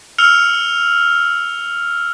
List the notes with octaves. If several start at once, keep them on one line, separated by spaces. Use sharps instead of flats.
E6 F6 C#7 F7